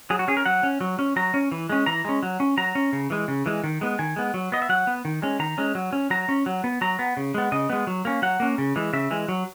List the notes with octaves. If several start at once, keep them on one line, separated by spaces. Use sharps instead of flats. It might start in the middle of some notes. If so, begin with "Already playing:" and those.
F#3 G#4
F#4
C#4 G#4
A#4
F#3 F#5
C#4
F#3
C#4
F#3 A#5
C#4
E3
G#3 C#4
E3 A#5
G#3 C#4
F#3
C#4
F#3 A#5
C#4
C#3
E3 G#3
C#3
E3 G#3
D#3
G#3 B3
D#3 G#5
G#3 B3
F#3
B3 D#5
E5
F#3 F#5
B3
D#3
G#3 C#4
D#3 A#5
G#3 C#4
F#3
C#4
F#3 A#5
C#4
F#3
B3
F#3 A#5
B3
C#3
G#3 B3
C#3 D#5
G#3 B3
F#3
A#3 C#4
F#3 F#5
A#3 C#4
C#3
E3 G#3
C#3 E5
E3 G#3
F#3